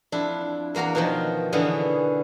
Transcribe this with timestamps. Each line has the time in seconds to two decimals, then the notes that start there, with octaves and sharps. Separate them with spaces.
0.12 F2 D4 E4
0.75 E2 A#3 F#4 A#4 F5
0.95 B2 D#3 F3
1.53 B2 D3 E3 B3 C#4 G#4